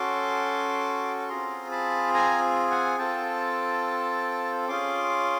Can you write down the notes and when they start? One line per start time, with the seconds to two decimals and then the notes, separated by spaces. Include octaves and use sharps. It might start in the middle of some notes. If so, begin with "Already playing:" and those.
Already playing: C#4 F#4 A4 C6 D6
1.29 C4 F4 G#4 A#5 C6
1.71 A5 B5
2.14 G#5 A#5
2.70 F#5 G#5
2.99 C4 F4 A4 G5 A5
4.68 C#4 F4 G#4 C6 D6